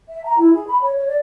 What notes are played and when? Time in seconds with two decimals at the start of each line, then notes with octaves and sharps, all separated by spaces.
0.09 E5
0.25 A#5
0.38 E4
0.53 G#4
0.67 B5
0.82 C#5
0.96 C#5
1.08 D5